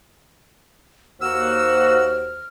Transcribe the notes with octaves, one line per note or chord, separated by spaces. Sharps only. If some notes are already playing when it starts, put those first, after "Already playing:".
D#2 A#3 F#4 C5 E6 F6